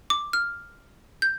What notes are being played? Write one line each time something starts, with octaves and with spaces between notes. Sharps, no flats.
D6
F6
G6